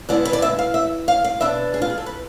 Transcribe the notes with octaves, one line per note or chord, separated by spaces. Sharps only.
D3 G#3 B3 E4 D5
B4
D5
E5
F5
E5
F5
F5
B2 B3 D4 E5
G#4
F4
G#4
A4
B4